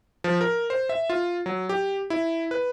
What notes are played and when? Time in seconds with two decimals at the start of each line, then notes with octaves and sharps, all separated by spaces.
0.24 F3
0.41 A#4
0.70 C5
0.89 E5
1.10 F4
1.46 F#3
1.69 G4
2.10 E4
2.51 B4